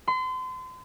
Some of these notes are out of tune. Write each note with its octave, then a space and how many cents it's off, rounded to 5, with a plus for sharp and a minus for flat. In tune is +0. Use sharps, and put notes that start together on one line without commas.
C6 -35